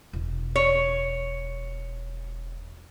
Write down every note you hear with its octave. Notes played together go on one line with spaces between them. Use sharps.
E1
C#5